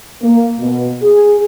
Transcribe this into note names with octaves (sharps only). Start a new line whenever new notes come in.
A#3
B2
G#4